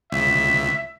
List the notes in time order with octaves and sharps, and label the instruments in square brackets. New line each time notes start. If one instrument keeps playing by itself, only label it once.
[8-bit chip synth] C#2 [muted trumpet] E5